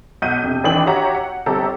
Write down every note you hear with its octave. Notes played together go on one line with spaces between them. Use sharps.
B1 F#5 G6 D#7
F2 C3
A1 D#3 E3 D4 G5 F#7
F#4 G4 C#5 E5 F#5 A#5
F#5
G1 C4 G4 A4 A#5